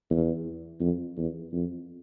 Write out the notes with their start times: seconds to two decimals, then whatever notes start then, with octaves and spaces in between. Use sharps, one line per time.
0.10 E2
0.80 F2
1.17 E2
1.53 F2